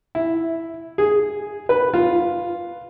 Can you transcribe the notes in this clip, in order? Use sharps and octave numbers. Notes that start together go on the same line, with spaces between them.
E4
G#4
B4
F4